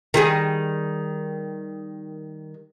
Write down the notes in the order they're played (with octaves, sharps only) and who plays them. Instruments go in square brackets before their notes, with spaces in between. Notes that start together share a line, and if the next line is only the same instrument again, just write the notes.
[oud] D#3 G3 G#4